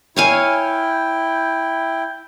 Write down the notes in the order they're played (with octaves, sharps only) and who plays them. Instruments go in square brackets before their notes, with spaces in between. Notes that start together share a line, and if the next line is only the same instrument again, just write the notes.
[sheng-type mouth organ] E4 [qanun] C#5 F5 G#5 [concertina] G5